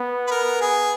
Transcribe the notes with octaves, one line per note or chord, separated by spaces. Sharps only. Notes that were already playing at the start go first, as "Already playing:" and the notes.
Already playing: B3
B4
A#4
G#4